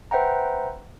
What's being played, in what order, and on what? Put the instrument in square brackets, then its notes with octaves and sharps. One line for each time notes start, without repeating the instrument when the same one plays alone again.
[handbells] B4 C5 E5 F#5 G5 A#5